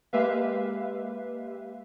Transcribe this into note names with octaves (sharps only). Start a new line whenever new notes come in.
G#3 A#3 G4 B4 E5 F5